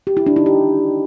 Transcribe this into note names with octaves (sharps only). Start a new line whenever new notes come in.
G4
E4
D4
D#4
G4